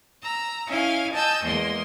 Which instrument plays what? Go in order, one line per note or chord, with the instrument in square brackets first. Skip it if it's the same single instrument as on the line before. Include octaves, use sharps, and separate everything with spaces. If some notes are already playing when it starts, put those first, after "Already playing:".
[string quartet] A#5 E6
C#4 E4 D#5 F5 G#5
D#5 G#5 A5 E6 G6
E2 G#3 A#3 D#5 C6